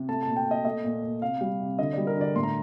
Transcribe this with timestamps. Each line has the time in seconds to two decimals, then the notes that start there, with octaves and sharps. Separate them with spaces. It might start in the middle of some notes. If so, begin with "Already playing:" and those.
Already playing: C3
0.09 A3 A5
0.23 A#2 A5
0.36 G5
0.47 A#2 D#5
0.65 A3 D#5
0.84 A#2
1.03 A#2
1.22 C3 F5
1.41 G3
1.60 C3
1.79 D3 D#5
1.93 G3 D5
2.07 A#4
2.17 D3 D5
2.36 A2 C6
2.43 A#5